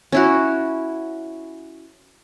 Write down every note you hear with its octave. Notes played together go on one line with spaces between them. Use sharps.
C#4 E4 F#4